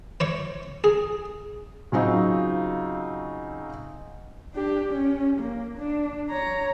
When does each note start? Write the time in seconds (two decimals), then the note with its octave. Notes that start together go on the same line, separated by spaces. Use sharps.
0.20 C5 C#5 C#6
0.84 G#4
1.92 C#3 F#3 C4 D#4 F4
4.54 D4 G4
4.88 C#4
5.39 A#3
5.78 D4
6.30 C#5 A#5